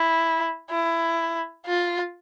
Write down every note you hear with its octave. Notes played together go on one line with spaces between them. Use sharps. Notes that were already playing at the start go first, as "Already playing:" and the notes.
Already playing: E4
E4
F4